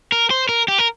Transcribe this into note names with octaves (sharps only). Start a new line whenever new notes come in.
A#4
C5
A#4
G4
A#4